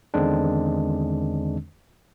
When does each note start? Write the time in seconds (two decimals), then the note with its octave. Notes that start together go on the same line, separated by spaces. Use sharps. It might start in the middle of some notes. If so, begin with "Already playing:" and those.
0.14 E2 D3 D#3 G#3 C4 D4